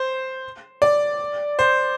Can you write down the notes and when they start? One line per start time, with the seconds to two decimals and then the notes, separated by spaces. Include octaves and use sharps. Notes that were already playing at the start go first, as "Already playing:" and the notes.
Already playing: C5
0.82 D5
1.59 C5